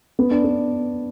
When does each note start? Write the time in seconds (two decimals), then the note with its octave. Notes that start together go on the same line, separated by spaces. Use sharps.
0.19 B3
0.31 D4
0.44 B3